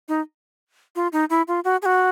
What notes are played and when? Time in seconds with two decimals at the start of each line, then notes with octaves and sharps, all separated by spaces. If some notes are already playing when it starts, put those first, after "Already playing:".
0.08 D#4
0.96 F4
1.13 D#4
1.30 E4
1.48 F4
1.64 F#4
1.82 G#4
1.86 F#4